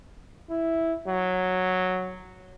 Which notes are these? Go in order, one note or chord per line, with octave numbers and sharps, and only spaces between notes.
E4
F#3